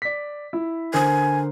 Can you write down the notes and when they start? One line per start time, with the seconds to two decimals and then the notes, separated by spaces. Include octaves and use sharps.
0.02 D5 B6
0.53 E4
0.93 D3 A#4 C5 G#5